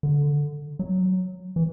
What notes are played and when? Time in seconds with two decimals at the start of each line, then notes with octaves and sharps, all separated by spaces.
0.03 D3
0.79 F#3
1.56 E3